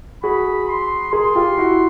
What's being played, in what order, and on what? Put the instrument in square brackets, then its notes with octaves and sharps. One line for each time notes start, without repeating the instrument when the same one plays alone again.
[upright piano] F#4 G#4 [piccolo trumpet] B5
[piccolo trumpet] C6
[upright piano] G#4 A#4 [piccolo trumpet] C6
[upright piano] F4 G4
E4 F#4